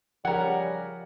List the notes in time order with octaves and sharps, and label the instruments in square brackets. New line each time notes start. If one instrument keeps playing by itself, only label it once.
[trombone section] C#3 G3 [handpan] F3 A#4 [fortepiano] F#5 [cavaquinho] G#5 A#5